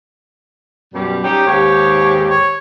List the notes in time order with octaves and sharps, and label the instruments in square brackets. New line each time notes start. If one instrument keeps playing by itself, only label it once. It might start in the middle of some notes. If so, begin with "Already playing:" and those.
[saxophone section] F#2 B2 G3
C#4 D#4 G4
[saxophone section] D#2 G#2 G4 [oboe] C#5
[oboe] C#5